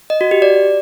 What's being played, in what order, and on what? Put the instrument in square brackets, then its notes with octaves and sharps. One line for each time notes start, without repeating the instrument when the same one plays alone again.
[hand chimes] D#5
F#4
G4
D5